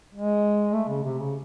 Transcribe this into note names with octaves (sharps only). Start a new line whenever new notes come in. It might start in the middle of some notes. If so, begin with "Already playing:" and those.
G#3
A3
C#3
C3
C#3